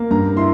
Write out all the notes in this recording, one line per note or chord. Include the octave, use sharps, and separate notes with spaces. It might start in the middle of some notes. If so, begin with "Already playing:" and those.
Already playing: A#3
G2 A#5
E4 C6